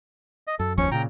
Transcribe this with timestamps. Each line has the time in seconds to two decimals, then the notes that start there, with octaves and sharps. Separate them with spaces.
0.47 D#5
0.59 F#2 A4
0.78 F#1 D#2 F3 C#4 C#6
0.91 A#2 C#3 G5 A#5